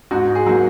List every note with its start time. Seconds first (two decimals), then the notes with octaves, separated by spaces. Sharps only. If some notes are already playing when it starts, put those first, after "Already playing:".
0.11 G#2 F#4
0.35 G#4
0.46 F#3 A#3